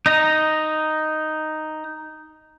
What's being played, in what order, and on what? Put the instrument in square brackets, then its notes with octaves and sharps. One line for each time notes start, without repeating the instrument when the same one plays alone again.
[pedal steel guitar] D#4 D#5 A#5